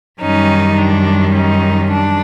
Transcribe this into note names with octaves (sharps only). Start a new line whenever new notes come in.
F#2 D#3 G3 C#4 D#4
D4
C#4 D#4
D4